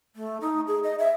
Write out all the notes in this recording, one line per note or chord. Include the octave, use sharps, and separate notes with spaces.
A3
D#4
G#4
D#5
E5